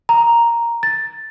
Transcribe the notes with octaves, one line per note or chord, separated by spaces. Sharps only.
A#5
A6